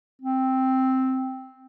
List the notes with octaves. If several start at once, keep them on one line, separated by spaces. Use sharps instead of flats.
C4